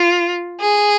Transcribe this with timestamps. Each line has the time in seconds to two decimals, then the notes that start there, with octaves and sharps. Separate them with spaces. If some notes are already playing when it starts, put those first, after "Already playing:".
Already playing: F4
0.60 G#4